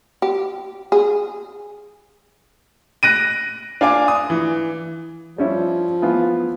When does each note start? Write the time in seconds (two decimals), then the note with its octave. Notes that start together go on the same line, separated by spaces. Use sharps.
0.22 G4
0.92 G#4
3.03 F#6 A#6 D7 D#7
3.81 D4 F5 G#5 D6
4.08 D#6
4.30 E3
5.38 F3 G3 C#4 E4
6.02 E3 B3 F4